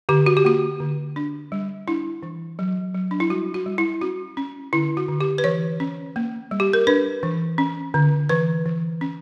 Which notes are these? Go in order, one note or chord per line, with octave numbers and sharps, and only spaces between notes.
D3 G4
F#4
G4
A#3 F#4
D3
D4
G3
D4 E4
E3
F#3
F#3
D4
E4
G3 F#4
F#4
G3
E4
C#4 F#4
C#4
D3 E4
F#4
D3
G4
B4
E3 C#5
C#4
A#3
G3
G4
A#4
D4 B4
E3
C#4
D3
E3 B4
E3
C#4